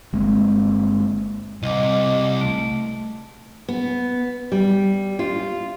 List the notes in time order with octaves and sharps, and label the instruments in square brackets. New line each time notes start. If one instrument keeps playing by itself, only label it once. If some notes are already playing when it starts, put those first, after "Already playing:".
[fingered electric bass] G1 G#3 A#3 C4
[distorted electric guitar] C2 [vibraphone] D#5 D6
[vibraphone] A3
[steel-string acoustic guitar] B3
G3
F4